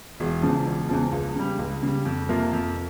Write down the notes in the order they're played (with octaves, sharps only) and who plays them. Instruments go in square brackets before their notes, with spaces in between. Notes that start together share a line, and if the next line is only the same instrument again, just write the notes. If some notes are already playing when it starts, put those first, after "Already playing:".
[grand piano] E1
E2 C#3 F3
E1
E2 C#3 F3
C#2
C#3 G3
C#2
C#3 G3
F2
C3 F3 A#3 F4
F2